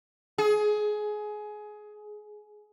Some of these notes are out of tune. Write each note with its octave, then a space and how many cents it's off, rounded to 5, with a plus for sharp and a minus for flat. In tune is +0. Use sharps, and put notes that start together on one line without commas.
G#4 +20